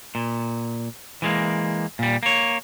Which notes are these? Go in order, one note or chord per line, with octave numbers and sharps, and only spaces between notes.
A#2
E3 G#3 A#3
A#2 G3
A#3 C#5